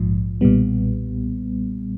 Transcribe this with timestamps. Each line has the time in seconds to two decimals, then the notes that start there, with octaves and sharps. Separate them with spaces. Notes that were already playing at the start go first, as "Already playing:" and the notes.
Already playing: A#1 G#2 F3
0.41 B1 A#2 G3 B3